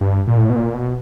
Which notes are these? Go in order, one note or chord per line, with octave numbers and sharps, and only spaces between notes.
G2
A#2
A2
B2
A#2
B2